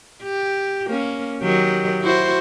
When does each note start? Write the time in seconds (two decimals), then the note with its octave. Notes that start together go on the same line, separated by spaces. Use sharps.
0.23 G4
0.87 A#3 C#4
1.42 D#3 F#3 G4
2.02 E4 F#4 C5